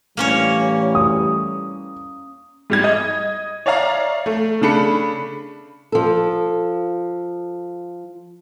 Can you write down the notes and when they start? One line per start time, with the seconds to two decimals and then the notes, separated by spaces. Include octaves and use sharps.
0.17 A2 E3 G3 A#3 C#4 C#5
0.95 D#6
2.70 G#2 G3 G#6
2.84 D#5
3.66 C#5 D5 E5 F5 A#5
4.26 A3
4.61 C#3 A3 D4 B5 C#7
5.92 F3 A4